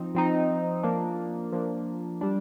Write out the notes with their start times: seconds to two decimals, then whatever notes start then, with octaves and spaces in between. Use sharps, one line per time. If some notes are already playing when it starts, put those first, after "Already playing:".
Already playing: F3 C4 D#4
0.15 F3 C4 D#4
0.83 F3 A#3 D4
1.52 F3 A#3 D4
2.21 G3 D4